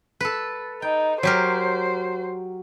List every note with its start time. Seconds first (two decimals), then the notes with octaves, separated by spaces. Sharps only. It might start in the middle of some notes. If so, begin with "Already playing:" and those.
0.20 A4 B4
0.82 D#4 G5
1.23 F#3 G4 A#4 C5